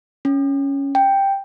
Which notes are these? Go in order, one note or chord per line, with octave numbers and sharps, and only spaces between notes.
C#4
G5